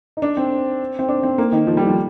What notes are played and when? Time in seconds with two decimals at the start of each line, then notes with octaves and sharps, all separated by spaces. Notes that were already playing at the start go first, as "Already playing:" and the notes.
0.17 D#4
0.22 D4
0.37 C4
0.99 C4
1.09 D4
1.23 C4
1.38 A#3
1.52 D#3
1.67 F3
1.77 G3
1.87 F3